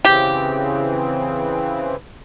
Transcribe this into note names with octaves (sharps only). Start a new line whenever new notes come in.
C#3 E3 C4 G4